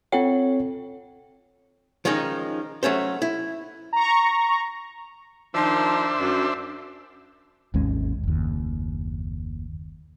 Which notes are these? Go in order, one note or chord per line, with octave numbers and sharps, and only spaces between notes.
C4 F4 A4 C#5 F#5 G5
D#3 F3 G#3 C#4 D#4
F#3 A3 C#4 C5
E4
A#5 C#6
D#3 F3 D4 C5 E5
F#2
G#1 D#2 G#3 C#4
F#1 D#2